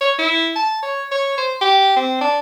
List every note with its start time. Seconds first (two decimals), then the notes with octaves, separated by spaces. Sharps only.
0.01 C#5
0.18 E4
0.55 A5
0.82 C#5
1.11 C#5
1.38 C5
1.61 G4
1.96 C4
2.21 D4